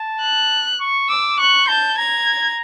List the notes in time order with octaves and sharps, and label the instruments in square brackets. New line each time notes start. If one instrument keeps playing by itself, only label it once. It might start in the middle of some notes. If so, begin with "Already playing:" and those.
Already playing: [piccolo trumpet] A5
[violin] F#6
[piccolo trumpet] C#6
[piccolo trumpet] D6 [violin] E6
[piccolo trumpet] C#6 [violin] F#6
[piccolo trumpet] A5 [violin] G6
[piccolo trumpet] A#5 [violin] G#6